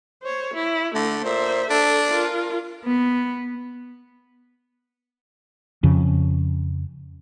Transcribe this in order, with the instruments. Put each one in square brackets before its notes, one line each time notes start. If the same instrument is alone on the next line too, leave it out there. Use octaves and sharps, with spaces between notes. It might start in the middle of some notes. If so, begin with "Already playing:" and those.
[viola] C5 C#5
E4
[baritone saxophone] D3 [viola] A3
[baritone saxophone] A#2 [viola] C5 E5
[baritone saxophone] D4 [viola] A4
[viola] F4 A#4
[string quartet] B3
[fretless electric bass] F2 C#3